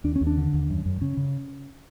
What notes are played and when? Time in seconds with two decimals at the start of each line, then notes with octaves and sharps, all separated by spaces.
0.04 D#2 D4
0.16 C#4
0.21 D#2
0.27 D4
0.38 D3
0.53 D#2
0.70 F#2
0.86 F#2
1.01 C#3 C#4
1.17 C#3